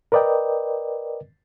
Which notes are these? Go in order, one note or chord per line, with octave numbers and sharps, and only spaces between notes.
A#4 B4 D5 D#5 G5